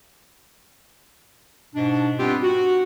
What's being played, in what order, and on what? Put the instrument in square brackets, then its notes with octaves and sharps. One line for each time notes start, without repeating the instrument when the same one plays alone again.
[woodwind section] G#2 B2 D4
G3 B3 C4 D4 F4 G4
F#4